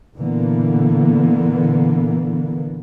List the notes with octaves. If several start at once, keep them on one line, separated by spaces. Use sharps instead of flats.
A#2 D3 E3 A#3 B3